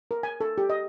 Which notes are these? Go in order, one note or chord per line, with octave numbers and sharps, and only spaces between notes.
A#4
G#5
A4
G4
D#5